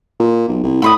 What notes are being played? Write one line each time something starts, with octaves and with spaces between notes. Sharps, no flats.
A#2
B1
C2
A2 B5 C6 D#6